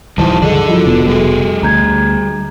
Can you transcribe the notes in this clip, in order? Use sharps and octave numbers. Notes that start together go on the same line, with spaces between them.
D1 E3 F3 G3 D#4 C5 A5
C#2 G2 D3 D4 G#4 A4 D#5
F3 F#3 E4 F4 D#5
F1 B2 B3
G3 F#4 G#4 A4
D2 A#5 G6 G#6